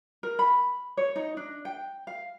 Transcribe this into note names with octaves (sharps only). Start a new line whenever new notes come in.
A#4
B5
C#5
D#4
D4
G5
F5